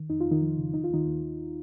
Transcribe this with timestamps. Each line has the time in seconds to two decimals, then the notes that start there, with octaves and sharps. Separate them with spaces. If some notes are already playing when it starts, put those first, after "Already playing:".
Already playing: D#3
0.10 F2 D#4
0.20 F2 F4
0.31 D#3 D#4
0.41 F3
0.58 C#3
0.74 D#3 D#4
0.84 F4
0.90 D#2 D#3 D#4
1.07 D#2
1.22 D#3